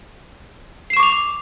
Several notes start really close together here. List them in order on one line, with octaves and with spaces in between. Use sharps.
C7 E7 C#6 D6 F7